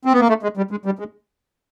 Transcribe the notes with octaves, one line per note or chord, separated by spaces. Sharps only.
C4
B3
A#3
A3
G#3
G3
G#3
G3
G#3